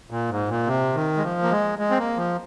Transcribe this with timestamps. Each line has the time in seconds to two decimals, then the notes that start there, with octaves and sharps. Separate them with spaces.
0.10 A#2
0.30 G#2
0.49 A#2
0.67 C3
0.95 D#3
1.17 G#3
1.23 F3
1.43 A#3
1.51 G#3
1.79 G#3
1.91 C4
1.98 A#3
2.17 F3